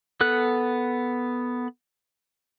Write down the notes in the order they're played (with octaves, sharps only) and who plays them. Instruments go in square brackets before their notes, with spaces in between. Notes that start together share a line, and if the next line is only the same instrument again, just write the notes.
[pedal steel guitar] B3 A4 F#6